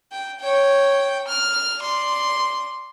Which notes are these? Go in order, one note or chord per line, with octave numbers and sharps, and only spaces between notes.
G5
C#5 G5
F6
D5 C6